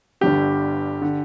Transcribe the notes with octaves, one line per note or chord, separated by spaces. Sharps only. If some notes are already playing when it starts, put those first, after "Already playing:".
G1 G2 D3 G4
D3